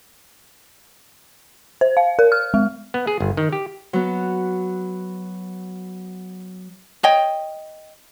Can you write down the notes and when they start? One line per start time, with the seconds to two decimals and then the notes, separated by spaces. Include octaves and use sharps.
1.81 C5
1.97 F5
2.19 A#4
2.32 F6
2.54 G#3
2.94 B3
3.07 G#4
3.20 G1
3.37 D#3
3.53 G4
3.93 F#3 B3
7.03 C#5 D#5 G5